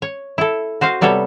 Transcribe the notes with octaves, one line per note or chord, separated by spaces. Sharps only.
C#5
E4 A4
F#4 C5 D#5 F5
C3 G3 B3 A4 C#5